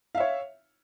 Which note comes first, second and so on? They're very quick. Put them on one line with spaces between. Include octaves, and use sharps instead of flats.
F5 E5 C#5